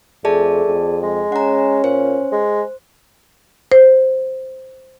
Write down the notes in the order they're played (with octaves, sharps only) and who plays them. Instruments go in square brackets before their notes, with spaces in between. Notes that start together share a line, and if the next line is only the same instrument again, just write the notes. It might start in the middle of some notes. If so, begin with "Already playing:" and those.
[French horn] F2 [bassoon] A3 [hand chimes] G#4 D5 A5
[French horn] F2
[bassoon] G#3
[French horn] C#4 [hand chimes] F#5 A#5
[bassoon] A#2 [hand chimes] C5
[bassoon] G#3
[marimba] C5